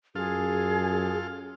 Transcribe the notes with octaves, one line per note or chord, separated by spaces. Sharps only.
F#2 F4 G#4 A4 F5